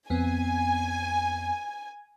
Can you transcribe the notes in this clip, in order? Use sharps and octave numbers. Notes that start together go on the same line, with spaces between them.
F2 B3 C4 G#5